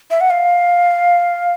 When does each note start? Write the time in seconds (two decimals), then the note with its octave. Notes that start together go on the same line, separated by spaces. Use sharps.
0.11 E5
0.21 F#5
0.30 F5